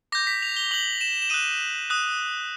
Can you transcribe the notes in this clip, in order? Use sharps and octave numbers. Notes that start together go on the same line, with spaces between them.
D6 G6 A#6
B6
F7
G7
D6 G6 F#7
E7
E7
D#6 F#6 D#7
D#6 F#6